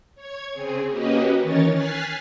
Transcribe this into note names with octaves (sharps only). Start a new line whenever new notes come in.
C#5 G#6
C#3 C4 G#4
A#3 C#4 F#4 G4 B4 D#5
D#3 E3 C#4 A#4 C#5 A6
G#5 F6 F#6 A6 B6 C7